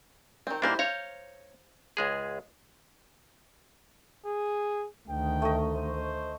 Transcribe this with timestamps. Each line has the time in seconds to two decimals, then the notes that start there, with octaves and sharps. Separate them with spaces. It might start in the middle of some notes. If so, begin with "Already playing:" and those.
0.47 D#3 C4
0.62 A#2 A#3 D4 E4 G4 C5
0.79 C5 C#5 F5 A#5
1.97 C#2 G#3 G#4
4.26 G#4
5.09 D2 D#3 G5
5.42 A3 D#5
5.73 C5